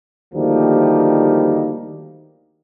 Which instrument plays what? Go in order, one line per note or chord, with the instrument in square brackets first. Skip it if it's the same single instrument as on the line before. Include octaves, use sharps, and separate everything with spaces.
[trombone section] D2 D#3 F3 G3 A#3